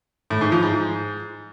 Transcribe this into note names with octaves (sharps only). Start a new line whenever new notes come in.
A2
G#2
F3
G#2